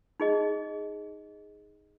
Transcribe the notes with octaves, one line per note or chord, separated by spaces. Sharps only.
D#4 G#4 D#5